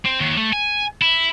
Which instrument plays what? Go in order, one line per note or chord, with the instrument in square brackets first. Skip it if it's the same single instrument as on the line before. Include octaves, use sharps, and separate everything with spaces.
[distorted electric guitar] C4
D#2
A3
G#5
E4